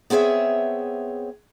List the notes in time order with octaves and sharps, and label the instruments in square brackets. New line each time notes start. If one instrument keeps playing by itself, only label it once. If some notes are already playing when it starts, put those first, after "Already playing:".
[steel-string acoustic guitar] B3 C4 G#4 C#5 E5